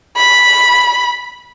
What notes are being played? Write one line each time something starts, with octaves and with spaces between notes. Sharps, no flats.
B5